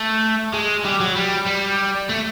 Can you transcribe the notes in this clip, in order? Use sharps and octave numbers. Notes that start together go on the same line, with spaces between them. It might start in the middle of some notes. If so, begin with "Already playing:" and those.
Already playing: A3
G#3
G3
F#3
G3
G3
A3